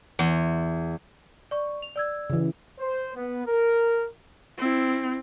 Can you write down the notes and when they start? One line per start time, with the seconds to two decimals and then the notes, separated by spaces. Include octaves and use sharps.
0.19 E2
1.51 D5 C#6
1.82 F7
1.96 D5 E6 G#6
2.30 C#3 E3
2.79 C5
3.15 B3
3.46 A#4
4.58 C4 E4